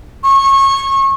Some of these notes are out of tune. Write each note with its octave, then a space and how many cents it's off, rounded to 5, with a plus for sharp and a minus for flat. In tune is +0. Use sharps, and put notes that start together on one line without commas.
C#6 -25